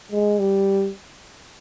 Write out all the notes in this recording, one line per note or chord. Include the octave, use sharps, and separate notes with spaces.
G#3
G3